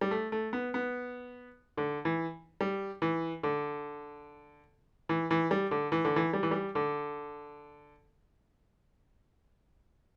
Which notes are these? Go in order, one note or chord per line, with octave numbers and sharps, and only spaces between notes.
G3
A3
A3
B3
B3
D3
E3
G3
E3
D3
E3
E3
G3
D3
E3
D3
E3
G3
E3
G3
D3